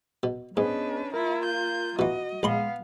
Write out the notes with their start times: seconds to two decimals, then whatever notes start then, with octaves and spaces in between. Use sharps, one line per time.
0.23 B2
0.57 G#2 B3 C#4 D4 G#4 B4 D#5
1.14 A#3 E4 F4 A#4
1.45 G6
1.99 B2 E3 F#4 D#5
2.43 A#1 G#3 B3 F5 B5 C6